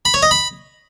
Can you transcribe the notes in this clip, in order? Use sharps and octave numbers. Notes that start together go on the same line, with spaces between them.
B5
C#5
D#5
B5